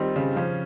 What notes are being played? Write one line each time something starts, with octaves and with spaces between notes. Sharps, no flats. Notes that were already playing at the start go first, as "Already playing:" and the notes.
Already playing: D#3 G3 C4 D#4 F4
C#3
F3 C#4